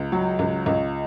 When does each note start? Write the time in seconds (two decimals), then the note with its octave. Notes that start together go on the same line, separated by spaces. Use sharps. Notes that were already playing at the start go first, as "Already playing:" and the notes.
Already playing: C#2
0.12 F#3
0.39 C#2
0.66 C#2